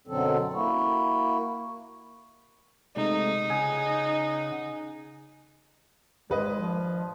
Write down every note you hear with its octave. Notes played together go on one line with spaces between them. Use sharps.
F#2 B2 D3 F#3 C4 A4
A#3 E4 F#4
C3 G#3 A3 D#4
C#3 G#4 F#5
G#1 G#3 B4 D#5
F3